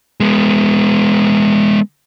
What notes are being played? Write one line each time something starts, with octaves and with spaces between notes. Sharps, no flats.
G#3 B3